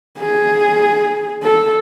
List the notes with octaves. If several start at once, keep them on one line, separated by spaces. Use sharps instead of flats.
G#4
A4